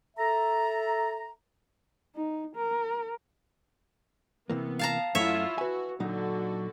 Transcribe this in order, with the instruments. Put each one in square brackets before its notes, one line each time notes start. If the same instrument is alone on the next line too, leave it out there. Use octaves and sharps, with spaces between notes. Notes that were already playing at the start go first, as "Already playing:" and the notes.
[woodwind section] A4 E5 A#5
[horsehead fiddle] D#4
A#4
[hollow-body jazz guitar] C3 E3 A#3 [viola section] B3
[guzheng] F5 A5 A#5
[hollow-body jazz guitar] F#2 A3 [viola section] E4 F4 [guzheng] C#5 E5
[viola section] F#4 [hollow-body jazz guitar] B4 G#5
[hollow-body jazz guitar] A#2 F#3 D#4 [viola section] D3 F#4